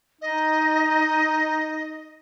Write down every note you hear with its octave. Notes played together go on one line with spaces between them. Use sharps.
D#4 D#5